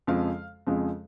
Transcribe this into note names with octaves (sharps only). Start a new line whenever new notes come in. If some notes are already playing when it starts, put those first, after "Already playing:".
F2 C#3 F3 G#3 F5
F2 C#3 F3 G#3